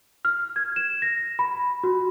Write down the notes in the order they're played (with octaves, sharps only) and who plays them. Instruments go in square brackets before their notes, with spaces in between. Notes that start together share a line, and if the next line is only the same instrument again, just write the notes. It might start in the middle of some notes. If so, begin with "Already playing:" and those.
[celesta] F6
G#6
E7
A#6
B5
F#4